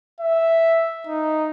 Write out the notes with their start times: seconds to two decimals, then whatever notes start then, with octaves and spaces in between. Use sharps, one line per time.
0.21 E5
1.07 D#4